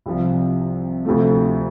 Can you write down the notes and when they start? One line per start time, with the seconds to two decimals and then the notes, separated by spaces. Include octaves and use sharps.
0.06 C2 C3 F3
1.05 D2 C3 F3 A3